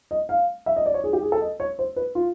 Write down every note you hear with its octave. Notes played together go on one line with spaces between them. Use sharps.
D#5
F5
E5
D#5
D5
C#5
G#4
G4
G#4
A4
D#5
C#5
C5
B4
F4